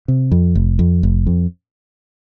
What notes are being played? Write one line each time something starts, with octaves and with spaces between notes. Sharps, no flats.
C3
F2
F1
F2
F1
F2